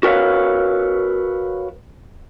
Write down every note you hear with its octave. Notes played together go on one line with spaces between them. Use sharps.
F#4 A#4 B4 C#5 F5